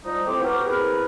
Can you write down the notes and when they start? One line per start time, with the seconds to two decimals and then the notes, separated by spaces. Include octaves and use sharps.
0.05 F3 G3 D#4
0.27 A3 C4 E4 F4 G4
0.42 B3 F#4 G4 A#4
0.65 A#3 C4 E4 G#4 A#4 B4